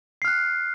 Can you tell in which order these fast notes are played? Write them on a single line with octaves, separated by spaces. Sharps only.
C7 F6 F#6